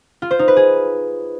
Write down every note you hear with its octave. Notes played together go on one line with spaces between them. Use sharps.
F4
C5
D#4
B4
G#4